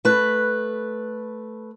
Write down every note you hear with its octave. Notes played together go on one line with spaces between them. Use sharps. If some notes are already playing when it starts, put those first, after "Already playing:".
A3 B4